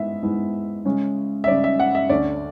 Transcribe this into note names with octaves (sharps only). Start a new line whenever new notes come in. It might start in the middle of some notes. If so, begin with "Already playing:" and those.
Already playing: G#2 G#3 B3 E4 E5
G#2 G#3 B3 E4
C#3 G#3 C#4
E5
C#3 G#3 C#4 D5
E5
F#5
E5
D2 D3 A3 C#4 D5